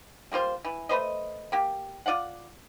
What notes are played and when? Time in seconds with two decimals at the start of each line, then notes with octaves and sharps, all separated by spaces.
0.32 G3 A#3 F4 C5
0.65 E3
0.89 A3 B4 C5 D#5
1.52 A#3 G4
2.06 F4 D5 F5 F#5